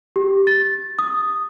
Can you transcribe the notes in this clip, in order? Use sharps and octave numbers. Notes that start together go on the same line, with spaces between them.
G4
A6
D#6